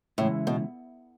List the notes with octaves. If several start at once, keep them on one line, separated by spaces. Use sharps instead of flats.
A2 C#3 E3 G#3 C#4 E4
B2